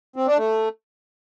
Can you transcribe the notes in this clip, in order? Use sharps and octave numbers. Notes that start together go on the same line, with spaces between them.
C4
D4
A3